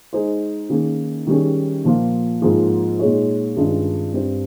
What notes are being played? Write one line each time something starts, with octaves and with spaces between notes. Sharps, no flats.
G#3 D#4 G#4 C5
D#3 A#3 C#4 G#4
D#3 G3 C#4 G#4
A#2 F3 A#3 F4
G#2 F3 A#3 F4 G#4
A#2 G#3 D#4 G#4 C#5
G2 D#3 G#3 C#4 F4
G2 G3 C4